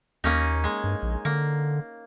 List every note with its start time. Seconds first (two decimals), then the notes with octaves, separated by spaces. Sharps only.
0.24 D#2 A#3 C#4 D#4
0.64 G#3
0.84 G2
1.02 A#1
1.25 D3 A#3